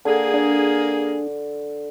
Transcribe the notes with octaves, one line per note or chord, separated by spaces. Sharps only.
D3 A#3 G#4 A4
D4